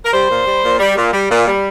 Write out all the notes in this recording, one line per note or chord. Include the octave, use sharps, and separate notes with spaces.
A#4
G3 C5
A#2
G3
A#2
G3
A#2
G3
A#2
G3